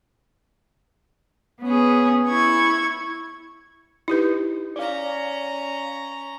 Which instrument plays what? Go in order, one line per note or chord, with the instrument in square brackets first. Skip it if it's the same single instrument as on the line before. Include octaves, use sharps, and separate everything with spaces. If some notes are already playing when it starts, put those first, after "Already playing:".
[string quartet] B3 C#4 G#4
E4 C#6 G#6
[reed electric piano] D#4 [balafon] E4 G4 B4
[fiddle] C#4 A#5 [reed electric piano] D5 F5